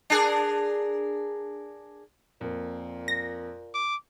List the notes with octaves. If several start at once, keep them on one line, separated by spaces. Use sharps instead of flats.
D4 G#4 A#4
F2 A#2 A#3
A#6
D6